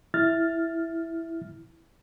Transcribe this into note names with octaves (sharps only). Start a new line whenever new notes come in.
E4 F6 A6